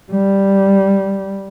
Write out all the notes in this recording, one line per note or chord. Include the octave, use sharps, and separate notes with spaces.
G3